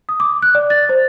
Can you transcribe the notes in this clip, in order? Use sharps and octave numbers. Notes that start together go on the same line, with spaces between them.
D#6
D6
F#6
D5
A6
C5